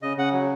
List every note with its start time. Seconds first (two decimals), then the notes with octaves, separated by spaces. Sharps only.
0.02 C#3 D#5
0.17 C#3 F#5
0.33 F#3